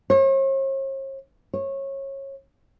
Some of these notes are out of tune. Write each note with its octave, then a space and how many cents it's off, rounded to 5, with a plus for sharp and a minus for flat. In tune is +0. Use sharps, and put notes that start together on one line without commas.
C#5 -45
C#5 -25